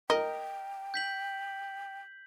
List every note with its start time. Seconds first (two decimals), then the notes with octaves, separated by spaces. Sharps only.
0.10 A#4 D#5 G5
0.94 G6 B6 F#7